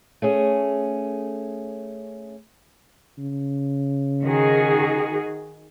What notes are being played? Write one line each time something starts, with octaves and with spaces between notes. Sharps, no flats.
A3 C#4 G#4
C#3
D#3 F#4 G#4